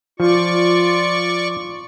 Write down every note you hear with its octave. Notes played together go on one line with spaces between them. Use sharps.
F3 F4 D5 C#6